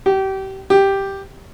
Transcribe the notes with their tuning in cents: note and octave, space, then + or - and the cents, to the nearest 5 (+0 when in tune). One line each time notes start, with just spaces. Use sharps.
G4 -30
G4 +0